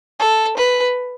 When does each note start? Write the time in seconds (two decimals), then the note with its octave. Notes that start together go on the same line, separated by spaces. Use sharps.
0.20 A4
0.57 B4